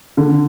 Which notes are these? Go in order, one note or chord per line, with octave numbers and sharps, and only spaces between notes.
D3